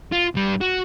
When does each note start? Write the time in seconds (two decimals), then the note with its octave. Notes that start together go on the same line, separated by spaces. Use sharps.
0.12 F4
0.35 G2 G3
0.61 F#4